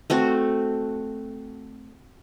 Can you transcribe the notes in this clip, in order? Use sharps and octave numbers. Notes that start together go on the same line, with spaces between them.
A3 C4 F#4